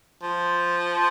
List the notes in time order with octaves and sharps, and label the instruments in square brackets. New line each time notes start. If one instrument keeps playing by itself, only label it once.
[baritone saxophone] F3